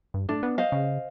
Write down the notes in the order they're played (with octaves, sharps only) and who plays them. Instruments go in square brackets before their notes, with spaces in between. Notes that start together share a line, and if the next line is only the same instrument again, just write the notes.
[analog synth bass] G2
[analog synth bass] A2 [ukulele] D4
[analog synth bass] B3
[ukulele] C5 D#5 F5
[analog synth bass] C#3